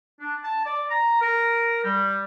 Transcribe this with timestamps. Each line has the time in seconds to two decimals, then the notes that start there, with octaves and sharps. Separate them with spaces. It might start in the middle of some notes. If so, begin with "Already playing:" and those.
0.20 D4
0.44 A5
0.66 D5
0.90 A#5
1.22 A#4
1.84 G3